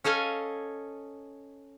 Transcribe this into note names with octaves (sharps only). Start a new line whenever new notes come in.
C#4 A4 D#5 F5 G#5